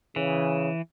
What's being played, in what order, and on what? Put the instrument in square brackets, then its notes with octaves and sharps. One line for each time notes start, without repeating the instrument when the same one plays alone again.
[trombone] C#3 [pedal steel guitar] E3